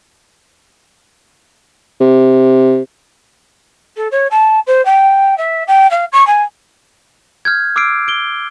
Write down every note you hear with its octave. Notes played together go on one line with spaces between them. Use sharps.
C3
A4
C#5
A5
C5
G5
E5
G5
F5
C#6
G#5
F6 G6 G#6
D6 E6 F6 C7 D7
D7 G7